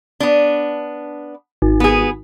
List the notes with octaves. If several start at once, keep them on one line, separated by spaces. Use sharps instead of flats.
B3 D4
G#1
B3 G#4